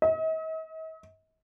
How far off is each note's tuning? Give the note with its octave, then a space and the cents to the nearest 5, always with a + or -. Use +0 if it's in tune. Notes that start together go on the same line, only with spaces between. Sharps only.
D#5 +45